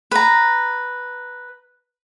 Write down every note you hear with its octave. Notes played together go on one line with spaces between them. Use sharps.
B4 A#5